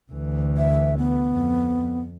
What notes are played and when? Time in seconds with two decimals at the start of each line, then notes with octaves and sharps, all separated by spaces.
0.12 D2 E3
0.57 E5
0.97 B3
1.33 F2